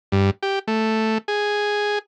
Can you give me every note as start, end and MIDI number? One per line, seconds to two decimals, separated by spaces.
0.12 0.30 43
0.43 0.59 67
0.68 1.18 57
1.28 1.99 68